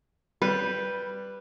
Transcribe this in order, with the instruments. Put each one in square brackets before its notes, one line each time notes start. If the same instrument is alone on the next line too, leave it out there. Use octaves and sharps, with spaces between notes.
[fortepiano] G3 [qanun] B4